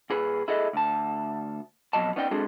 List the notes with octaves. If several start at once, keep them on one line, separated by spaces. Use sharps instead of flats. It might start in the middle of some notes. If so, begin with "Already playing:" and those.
A#2 G#4 B4
E4 G#4 A4 D#5
D2 A5
F2 B2 F#3 D#5 A5
B3 C#4 D#4 D5 F#5 G5
G#3 C4 D4 F#4 G#4 A4